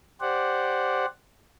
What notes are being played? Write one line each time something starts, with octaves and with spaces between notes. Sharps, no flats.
G4 C5 D5 F#5